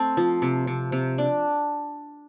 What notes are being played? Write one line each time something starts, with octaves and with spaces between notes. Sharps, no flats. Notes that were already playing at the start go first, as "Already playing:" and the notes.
Already playing: A3 C4 A4
F3
C3
C3
C3
D4